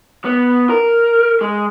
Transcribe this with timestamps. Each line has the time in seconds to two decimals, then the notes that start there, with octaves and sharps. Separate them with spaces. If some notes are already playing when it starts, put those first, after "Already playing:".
0.25 B3
0.70 A#4
1.41 G#3